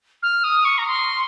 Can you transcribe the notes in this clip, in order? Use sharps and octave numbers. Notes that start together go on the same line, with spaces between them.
F6
D#6
C#6
A#5
C6